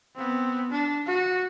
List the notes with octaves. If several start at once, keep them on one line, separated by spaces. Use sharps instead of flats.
B3 C4
D4
F#4